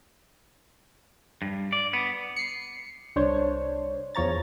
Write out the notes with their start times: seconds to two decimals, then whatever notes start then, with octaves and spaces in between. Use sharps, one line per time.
1.42 G2
1.73 D5
1.93 B3
2.36 C7 C#7
3.16 C2 D4 C5 C#5
4.15 E2 F3 C#5 A#5 A6